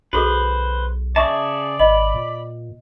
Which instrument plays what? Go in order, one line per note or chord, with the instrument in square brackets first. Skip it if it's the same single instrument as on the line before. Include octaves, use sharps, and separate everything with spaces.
[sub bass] B1 [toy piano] F#4 G#4 A4 [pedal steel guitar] B4 C5
[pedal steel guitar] C#3 G#4 A5 [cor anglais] D5 [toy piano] E5 C#6
[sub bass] G#1 [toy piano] D#5 [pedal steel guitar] B5
[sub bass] A#2